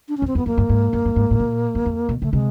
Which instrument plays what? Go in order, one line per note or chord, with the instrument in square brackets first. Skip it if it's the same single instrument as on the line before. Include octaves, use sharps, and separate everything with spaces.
[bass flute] D4
C#4
[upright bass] E2
[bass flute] C4
[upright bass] F2 [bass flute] B3
[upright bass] F#2 [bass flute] A#3
[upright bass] G2
G#2
G2
G2
G#2
A2
A#2
F#2
F2
B2
[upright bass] C#3 [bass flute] A3
[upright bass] C3 [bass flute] G#3